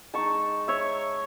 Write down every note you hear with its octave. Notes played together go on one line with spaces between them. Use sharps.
G#3 D#4 A5 C#6
C#5 E5